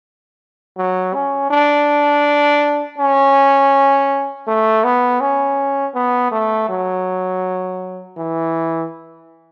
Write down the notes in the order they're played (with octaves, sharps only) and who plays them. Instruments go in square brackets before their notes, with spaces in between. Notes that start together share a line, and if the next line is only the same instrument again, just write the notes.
[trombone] F#3
C#4
D4
C#4
A3
B3
C#4
B3
A3
F#3
E3